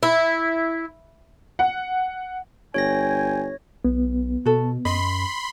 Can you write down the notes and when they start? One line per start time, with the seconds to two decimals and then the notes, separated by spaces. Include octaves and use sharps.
0.03 E4
1.59 F#5
2.74 G1 C#5 G5 G#5 A#6
3.85 B1 B3
4.45 B2 F#4 A4
4.85 F#2 D#5 B5 C6